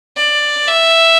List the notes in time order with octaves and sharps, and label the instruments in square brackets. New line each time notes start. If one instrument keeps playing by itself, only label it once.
[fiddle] D5
E5